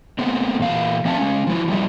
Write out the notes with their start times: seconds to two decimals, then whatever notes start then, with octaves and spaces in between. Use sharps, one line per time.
0.19 A3 B3 C4
0.60 A#2 E3 F5
1.05 F3 C4 E5 F5 G#5 A5
1.18 G#3 C#4
1.47 F3 E4
1.68 F3 G3 G#3 E4